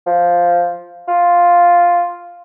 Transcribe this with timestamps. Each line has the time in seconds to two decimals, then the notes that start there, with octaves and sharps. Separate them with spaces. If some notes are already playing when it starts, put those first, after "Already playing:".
0.06 F3
1.08 F4